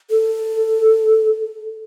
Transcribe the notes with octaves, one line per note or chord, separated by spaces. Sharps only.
A4